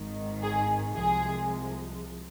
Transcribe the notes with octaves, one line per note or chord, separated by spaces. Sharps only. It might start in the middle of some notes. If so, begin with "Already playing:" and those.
Already playing: G#1 G#2 D#3
G#4
C2 C3 F3 G#3 G#4